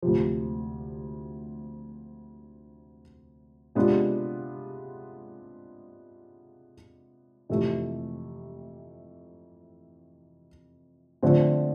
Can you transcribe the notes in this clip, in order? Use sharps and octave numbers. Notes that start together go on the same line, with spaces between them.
D2 C3 F3
C3 G#3 B3 D4 F4
F2 C3 E3 A3
D3 F3 A3 C4